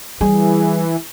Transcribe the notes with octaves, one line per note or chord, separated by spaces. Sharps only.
E3 G3 G#4